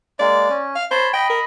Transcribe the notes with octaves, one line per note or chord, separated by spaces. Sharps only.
G#3 A#3 D5
C#4
F5
C5 C#5 A5 B5
D#5 G5 B5
A#4